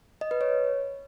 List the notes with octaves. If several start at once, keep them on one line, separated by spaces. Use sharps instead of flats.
D#5
B4
C#5